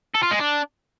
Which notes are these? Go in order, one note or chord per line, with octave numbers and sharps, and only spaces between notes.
A4
F4
G#3
D4